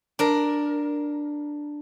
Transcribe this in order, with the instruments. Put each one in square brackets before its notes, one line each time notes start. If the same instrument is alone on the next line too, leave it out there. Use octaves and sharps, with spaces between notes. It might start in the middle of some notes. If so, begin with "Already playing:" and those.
[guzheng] D4 A#4